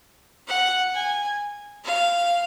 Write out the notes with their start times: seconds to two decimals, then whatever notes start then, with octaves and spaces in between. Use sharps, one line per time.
0.48 F#5
0.94 G#5
1.85 F5